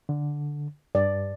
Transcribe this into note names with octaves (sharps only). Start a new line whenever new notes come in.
D3
G2 D5